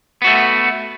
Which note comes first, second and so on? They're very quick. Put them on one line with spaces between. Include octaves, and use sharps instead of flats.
B3 F#4 A3